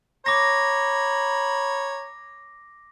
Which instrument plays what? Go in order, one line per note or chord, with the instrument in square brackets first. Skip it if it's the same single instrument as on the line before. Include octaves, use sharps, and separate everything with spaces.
[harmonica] C#5 A#5 B5 [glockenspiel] D6 A#6